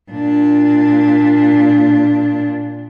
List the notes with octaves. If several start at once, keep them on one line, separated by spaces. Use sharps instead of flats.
A#2 D4